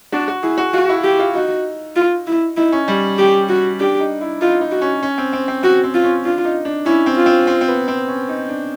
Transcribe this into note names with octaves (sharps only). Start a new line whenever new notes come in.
D4 F#4
F#4
E4 G#4
F#4
F4 F#4
E4
G4
F4
D#4 F#4
F4
E4
D#4 E4
C#4
G3
G4
F#4
D4 G4
D#4
E4
D#4 F4
D#4
F#4
C#4
C#4
C4
C4
C4
C4 F#4
C4
F4
C#4
D4 F4
D#4
D4
C#4 E4
C4
F4
C4
C4
C4
B3
C4
C#4
D#4
D4